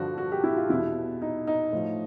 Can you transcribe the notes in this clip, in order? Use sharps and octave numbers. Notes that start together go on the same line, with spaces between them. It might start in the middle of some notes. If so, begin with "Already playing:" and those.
Already playing: G2 D3 F3 F#4
F#4
G4
E4
F4
E2 B2 E4
D#4
D#4
A2 F3